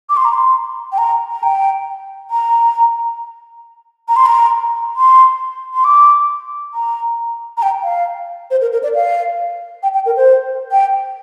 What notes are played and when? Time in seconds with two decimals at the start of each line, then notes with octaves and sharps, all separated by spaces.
0.09 D6
0.17 C6
0.25 A#5
0.33 C6
0.92 G5
0.98 A#5
1.31 A#5
1.43 G5
2.30 A#5
4.08 A#5
4.16 C6
4.26 A#5
4.96 C6
5.74 C6
5.84 D6
6.74 A#5
7.57 A#5
7.63 G5
7.84 F5
8.51 C5
8.61 A#4
8.72 A#4
8.83 D5
8.95 F5
9.83 G5
9.94 G5
10.06 A#4
10.16 C5
10.71 G5